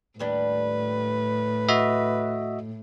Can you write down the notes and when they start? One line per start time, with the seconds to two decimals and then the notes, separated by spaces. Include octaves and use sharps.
0.19 D#2 A2 G3 D4 B4
1.69 F#4 D#5 E5